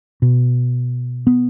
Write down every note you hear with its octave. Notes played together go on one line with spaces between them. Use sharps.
B2
B3